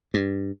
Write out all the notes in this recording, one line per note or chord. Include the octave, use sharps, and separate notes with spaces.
G2